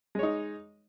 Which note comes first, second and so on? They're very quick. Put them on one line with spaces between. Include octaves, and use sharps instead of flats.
G#3 C#5 D#4